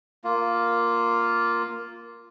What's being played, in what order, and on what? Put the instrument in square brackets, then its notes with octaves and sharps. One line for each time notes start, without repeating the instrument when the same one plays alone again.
[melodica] A#3 F4